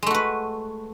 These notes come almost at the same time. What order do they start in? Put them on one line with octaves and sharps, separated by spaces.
G#3 A3 F#4 B4